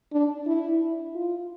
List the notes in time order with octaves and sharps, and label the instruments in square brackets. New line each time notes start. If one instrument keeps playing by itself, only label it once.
[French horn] D4
E4
F4